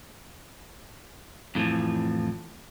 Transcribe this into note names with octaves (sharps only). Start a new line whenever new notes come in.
F2 A2 C3 E3 F3